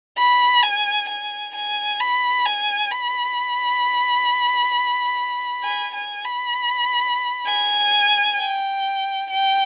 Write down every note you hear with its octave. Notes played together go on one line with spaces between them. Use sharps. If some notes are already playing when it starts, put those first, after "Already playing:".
B5
G#5
G#5
G#5
B5
G#5
B5
G#5
G#5
B5
G#5
G5
G5